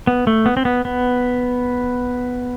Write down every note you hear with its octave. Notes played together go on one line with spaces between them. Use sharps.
B3
A3
B3
C4
B3
B3